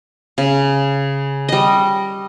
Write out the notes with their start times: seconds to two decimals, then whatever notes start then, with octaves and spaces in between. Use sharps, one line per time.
0.38 C#3
1.49 G3 D#5